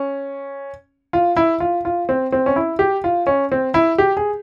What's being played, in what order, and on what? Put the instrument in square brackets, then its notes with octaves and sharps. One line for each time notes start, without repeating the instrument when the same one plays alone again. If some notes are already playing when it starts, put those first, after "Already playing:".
Already playing: [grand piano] C#4
F4
E4
F4
F4
C4
C4
C#4
E4
G4
F4
C#4
C4
E4
G4
G#4